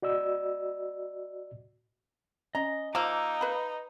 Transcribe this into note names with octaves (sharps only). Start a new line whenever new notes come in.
F#4 D5 D#5 E6
C#4 D#5 A#5
F3 A#3 D#4 A#5 D6 E6
B4 B5